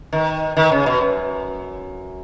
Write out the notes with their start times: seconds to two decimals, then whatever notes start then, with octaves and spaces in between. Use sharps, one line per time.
0.13 D#3
0.57 D#3
0.72 C#3
0.86 B2
1.01 F#2